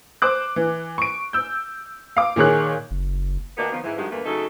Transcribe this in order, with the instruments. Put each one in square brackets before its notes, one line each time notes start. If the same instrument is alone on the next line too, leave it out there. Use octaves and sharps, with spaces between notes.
[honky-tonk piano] C5 D6 F#6
E3
C#6 D7
E6 G6
F5 D6
A#2 D#3 G#4 C#5 F#6
[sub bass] F#1
[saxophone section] D2 A#3 B3 D4 F#4 D#5
D#3 F3 B3
G#2 E3
G2 D#3 F3 G#3 F#4 G4
E2 G2 D3 A3 A#3 B4
C#3 F#3 A3 D#4 A4